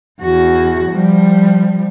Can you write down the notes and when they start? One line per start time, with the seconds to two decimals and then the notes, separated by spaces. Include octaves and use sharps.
0.21 E2 F#4
0.90 F3 G3